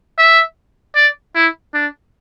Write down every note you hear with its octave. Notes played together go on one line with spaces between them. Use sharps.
E5
D5
E4
D4